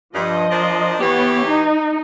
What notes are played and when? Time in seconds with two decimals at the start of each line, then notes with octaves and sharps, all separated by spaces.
0.14 G2 F3 D#5
0.51 D4 A#4 C5
1.01 E3 B3 G4 C#5
1.46 D#4